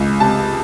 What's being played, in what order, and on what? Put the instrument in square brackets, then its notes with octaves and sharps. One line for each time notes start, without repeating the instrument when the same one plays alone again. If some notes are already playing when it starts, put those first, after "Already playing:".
Already playing: [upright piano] C#2
C3 A5